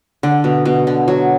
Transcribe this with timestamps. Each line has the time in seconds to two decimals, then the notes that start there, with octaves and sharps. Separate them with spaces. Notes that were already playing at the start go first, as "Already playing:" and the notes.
0.23 D3
0.44 B2
0.65 B2
0.87 D3
1.08 F#3